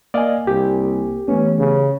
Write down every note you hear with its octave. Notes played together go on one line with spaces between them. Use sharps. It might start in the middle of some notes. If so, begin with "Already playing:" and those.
A#3 D5 D#5 F5 G#5
C2 G4
E3 A3 B3 C#4
C#3